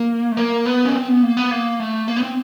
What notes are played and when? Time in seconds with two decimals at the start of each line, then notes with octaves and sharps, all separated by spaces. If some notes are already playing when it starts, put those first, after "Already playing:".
Already playing: A#3
0.32 A3
0.37 A#3
0.66 B3
0.85 C#4
0.95 C4
1.08 B3
1.23 A#3
1.37 B3
1.51 A#3
1.80 A3
2.08 A#3
2.16 B3
2.22 C4